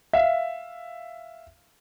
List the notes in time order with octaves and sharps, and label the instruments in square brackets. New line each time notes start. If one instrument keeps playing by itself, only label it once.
[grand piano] E5 F5